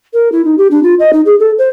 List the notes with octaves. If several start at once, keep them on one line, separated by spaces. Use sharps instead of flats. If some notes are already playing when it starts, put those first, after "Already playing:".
A#4
E4
D#4
G4
D4
F4
D#5
D#4
G#4
A4
C5